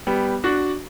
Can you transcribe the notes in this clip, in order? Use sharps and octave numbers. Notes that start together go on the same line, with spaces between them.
G3 B3
D4 F#4